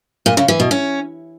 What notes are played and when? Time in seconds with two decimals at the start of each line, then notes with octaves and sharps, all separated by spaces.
0.26 A#2
0.37 C#3
0.48 E3
0.60 B2
0.71 C#4